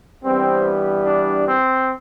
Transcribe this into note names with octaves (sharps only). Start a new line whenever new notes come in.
G2 E3 G3 B3 C4
D4
C4